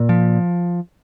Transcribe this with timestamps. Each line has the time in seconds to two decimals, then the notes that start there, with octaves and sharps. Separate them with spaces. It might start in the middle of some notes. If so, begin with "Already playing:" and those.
Already playing: A#2
0.09 F3